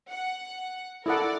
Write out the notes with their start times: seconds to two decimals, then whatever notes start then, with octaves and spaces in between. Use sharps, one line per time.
0.10 F#5
1.06 E4 A4 A#4 D5 F#5